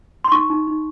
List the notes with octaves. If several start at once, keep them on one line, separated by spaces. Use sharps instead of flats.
C6
D#4 C#6
D#4
D#4